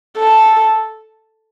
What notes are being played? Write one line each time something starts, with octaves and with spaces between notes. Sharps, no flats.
A4